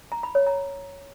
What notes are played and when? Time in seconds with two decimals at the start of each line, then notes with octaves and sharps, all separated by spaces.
0.12 A#5
0.23 B5
0.35 C#5
0.47 A#5